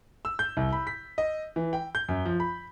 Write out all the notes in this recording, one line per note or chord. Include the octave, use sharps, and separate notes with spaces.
E6
G6
C2
B5
B6
D#5
E3
G5
G6
F#2
F3
B5